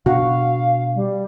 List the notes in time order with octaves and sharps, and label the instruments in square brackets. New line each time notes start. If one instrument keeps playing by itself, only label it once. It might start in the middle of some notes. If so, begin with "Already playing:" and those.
[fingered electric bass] B2 D4 [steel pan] F#4 [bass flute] F5
[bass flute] G3